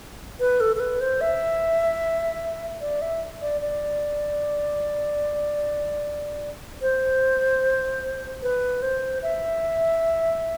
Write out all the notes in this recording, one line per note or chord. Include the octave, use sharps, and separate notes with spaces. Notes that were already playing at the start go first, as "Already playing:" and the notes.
B4
A4
A4
B4
C5
E5
D5
E5
D5
D5
C5
B4
C5
E5